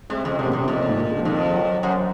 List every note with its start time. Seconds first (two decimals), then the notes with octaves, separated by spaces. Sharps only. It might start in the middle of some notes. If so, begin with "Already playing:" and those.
0.10 C3 G#3
0.24 F2 C#3
0.39 F#2 C3
0.47 A#2
0.53 F#2 C3
0.68 F2 A#2
0.89 G#2
0.96 A#2
1.10 C#3
1.19 F3
1.25 F2 D#3
1.40 F3
1.54 F#3
1.83 F#2 F#3